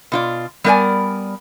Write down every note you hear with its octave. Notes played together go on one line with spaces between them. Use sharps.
B2 F4 D5
G3 B3 A#4 C5 D5 G#5